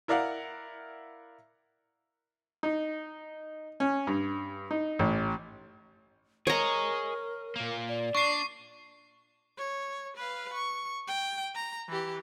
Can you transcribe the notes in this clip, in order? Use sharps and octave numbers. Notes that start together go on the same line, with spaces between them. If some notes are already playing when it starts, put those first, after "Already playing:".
E4 A#4 D5 F5 F#5
D#4
C#4
G2
D#4
A1
G#4 A#4 C#5 D#5 A#5
A#2 A#3
D5
D4 C#6 C7
C#5
B4 F5
C#6
G5
A#5
E3 G4